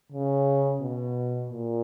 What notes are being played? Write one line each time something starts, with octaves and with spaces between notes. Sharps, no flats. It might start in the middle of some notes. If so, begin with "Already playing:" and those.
C#3
B2
A#2